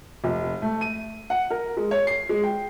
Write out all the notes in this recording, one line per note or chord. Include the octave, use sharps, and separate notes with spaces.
F1
A3
D#7
F#5
A#4
G#3
C#5
C7
G#3
G5